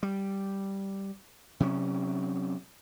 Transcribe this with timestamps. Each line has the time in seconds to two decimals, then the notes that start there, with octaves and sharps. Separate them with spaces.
0.03 G3
1.60 C3 F#3 C#4